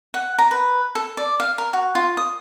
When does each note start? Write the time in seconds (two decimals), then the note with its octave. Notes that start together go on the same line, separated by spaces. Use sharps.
0.14 F#5
0.39 A#5
0.51 B4
0.95 A4
1.17 D5
1.40 F5
1.58 A#4
1.73 F#4
1.95 F4
2.17 D#6